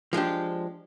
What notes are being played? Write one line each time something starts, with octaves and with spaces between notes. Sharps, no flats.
F3 G#3 D4 G4